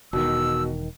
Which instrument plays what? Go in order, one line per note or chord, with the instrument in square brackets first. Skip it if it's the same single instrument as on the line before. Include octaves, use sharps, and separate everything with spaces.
[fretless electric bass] E1 D#3 [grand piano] B2 [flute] E6